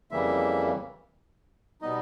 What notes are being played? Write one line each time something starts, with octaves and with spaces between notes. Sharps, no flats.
F2 C#3 E3 G3 A#3 E5
B2 G3 B3 D#4 D#5